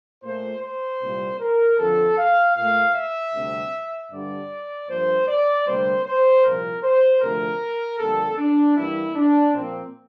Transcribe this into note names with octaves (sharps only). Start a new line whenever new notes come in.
A#2 A3 C5
C5
C2 A#2 G3 A#3
A#4
F2 D3 F3 A4
F5
A#2 A3 F5
E5
D2 C3 G3
G2 D3 G3 D5
G2 F3 A#3 C5
D5
D2 C3 G3 A#3 C5
C5
C2 A#2 F3 A#3 A#4
C5
D2 C3 F3 A3 A#4
F2 D3 G3 A#3 A4
D4
G2 E3 G3 A#3 E4
D4
A#2 F3 A#3 C4